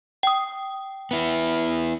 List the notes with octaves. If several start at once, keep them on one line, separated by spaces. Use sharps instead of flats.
G5 D#6
B3 E4